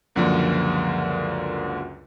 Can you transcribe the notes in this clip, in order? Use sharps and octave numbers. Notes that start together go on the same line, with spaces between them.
C#2 F#2 D3 F3 A#3